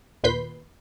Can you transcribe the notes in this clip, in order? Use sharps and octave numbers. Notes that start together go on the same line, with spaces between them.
D#2 A#2 B4 C6 G6 B6